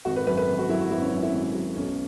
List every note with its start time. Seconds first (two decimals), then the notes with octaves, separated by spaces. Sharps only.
0.05 G#1 F#4
0.16 B4
0.26 F#2 B4
0.37 B4
0.48 G#1
0.59 F#4
0.69 F#3 E4
0.80 F#4
0.91 G#1 E4
1.02 C#4
1.12 F#2 C#4
1.23 E4
1.33 G#1
1.55 F#3
1.76 B1 C#4